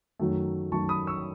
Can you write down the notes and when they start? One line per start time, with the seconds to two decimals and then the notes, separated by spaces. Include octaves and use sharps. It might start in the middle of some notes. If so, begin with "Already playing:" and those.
0.19 F#2 D#3 F#3 A3
0.72 F#2 D#3 F#3 A3 A5 C#6
0.89 B5 D#6
1.07 C#6 E6